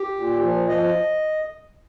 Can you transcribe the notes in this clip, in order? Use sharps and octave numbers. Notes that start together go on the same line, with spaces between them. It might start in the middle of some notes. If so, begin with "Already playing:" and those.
Already playing: G4
A#2
F3
F3 D#5